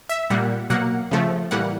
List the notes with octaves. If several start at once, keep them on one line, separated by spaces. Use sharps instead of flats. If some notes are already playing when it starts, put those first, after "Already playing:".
E5
A#2 G3 A#3 F#5
B2 F#3 A#3 F#5
C#3 F3 A3
A2 E3 G3 A#3 F#5